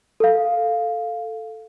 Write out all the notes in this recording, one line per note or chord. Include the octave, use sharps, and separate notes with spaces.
A4 F5